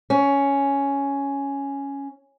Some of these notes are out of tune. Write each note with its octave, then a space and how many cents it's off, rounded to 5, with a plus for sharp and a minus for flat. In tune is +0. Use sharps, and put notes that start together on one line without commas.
C#4 +5